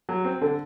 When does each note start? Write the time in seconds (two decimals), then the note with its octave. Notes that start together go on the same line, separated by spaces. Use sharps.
0.09 F#3
0.25 C4
0.41 D3